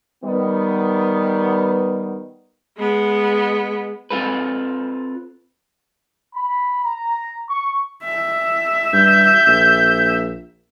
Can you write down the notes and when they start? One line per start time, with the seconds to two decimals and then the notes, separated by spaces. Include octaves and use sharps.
0.24 D#3 G3 B3
2.78 G#3 B3
4.11 C4 F4 A4 B4
6.35 B5
6.85 A#5
7.49 C#6
8.04 E5
8.93 G2 G6
9.48 A#1